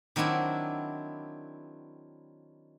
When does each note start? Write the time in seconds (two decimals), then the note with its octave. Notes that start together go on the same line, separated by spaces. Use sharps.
0.16 D#3 F#3 C4 D4 E4